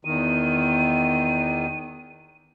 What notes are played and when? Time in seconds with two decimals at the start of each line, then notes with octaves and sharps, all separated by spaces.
0.05 E2 D#3 D#7